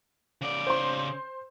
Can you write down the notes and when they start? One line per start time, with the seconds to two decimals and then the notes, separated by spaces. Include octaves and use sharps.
0.41 C#3 D5
0.67 C5 C6